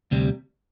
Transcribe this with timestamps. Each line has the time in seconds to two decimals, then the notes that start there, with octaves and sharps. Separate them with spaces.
0.11 D2 C3 G3